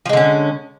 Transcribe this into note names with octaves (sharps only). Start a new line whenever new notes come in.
D3 F3 G#3 C#4